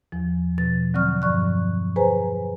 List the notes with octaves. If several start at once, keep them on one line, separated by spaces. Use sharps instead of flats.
E2 F3
B2 F3 A6
D3 F#3 C4 D5 C#6 F6
G2 F3 D5 C#6 F#6
G#4 B4 C5 G#5 A#5